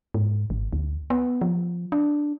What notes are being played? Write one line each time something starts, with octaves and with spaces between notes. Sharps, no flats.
G#2
G#1
D2
B3
F3
D4